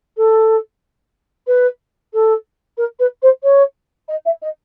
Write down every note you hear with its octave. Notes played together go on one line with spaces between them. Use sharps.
A4
B4
A4
A#4
B4
C5
C#5
D#5
E5
D#5